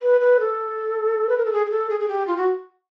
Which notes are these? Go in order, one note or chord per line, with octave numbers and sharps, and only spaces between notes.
B4
B4
A4
B4
A#4
A4
G#4
G#4
A4
G#4
G#4
G4
F4
F#4